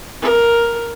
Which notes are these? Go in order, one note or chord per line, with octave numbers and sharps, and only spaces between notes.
A#4